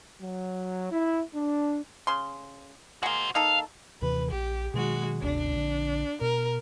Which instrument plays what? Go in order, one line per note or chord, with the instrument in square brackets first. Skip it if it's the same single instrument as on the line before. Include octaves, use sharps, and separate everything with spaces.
[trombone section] F#3
E4
D4
[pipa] C#3 C6
[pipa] G#3 A#3 [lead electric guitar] F#4 C5
[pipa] A#3 D#4 A4 [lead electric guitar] F5
[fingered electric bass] D#2 C3 E3 [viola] B4
[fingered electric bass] A#1 [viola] G4
[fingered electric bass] B2 D#3 F#3 [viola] G#3 F#4
[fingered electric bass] G1 D2 C3 [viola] D4
[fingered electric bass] A#1 D3
[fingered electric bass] B2 [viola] A#4